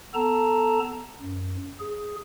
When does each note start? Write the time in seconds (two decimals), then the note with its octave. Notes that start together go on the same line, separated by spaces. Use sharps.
0.14 B3 A4 A5 A#5
1.22 F#2
1.79 G#4